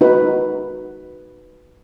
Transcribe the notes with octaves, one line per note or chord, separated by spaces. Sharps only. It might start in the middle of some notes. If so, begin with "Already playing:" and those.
D#4 F#4 B4